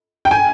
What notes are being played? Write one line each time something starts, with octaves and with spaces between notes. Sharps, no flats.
G5
G#5